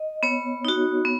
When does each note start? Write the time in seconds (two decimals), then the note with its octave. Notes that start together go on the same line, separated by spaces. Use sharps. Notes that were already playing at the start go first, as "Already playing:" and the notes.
Already playing: D#5
0.23 B3 C#5
0.65 D#4 F#4
1.05 B3